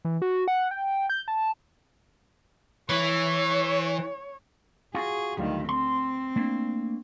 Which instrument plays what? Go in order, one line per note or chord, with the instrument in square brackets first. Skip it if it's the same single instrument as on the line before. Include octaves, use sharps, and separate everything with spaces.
[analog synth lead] E3
F#4
F#5
G5
G6
A5
[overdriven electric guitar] E3 [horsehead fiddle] C#5
[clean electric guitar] F4 F#4 [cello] G#4
[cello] D2 D#3 [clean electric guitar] F#3 G3 F4
[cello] C4 [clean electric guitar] C6
[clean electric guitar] A3 A#3 D4